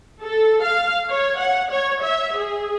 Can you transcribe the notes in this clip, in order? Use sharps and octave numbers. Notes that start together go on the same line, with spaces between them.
A4
F5
C#5
F#5
C#5
E5
G#4